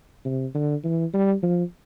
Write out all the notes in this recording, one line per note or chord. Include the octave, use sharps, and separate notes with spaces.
C3
D3
E3
G3
F3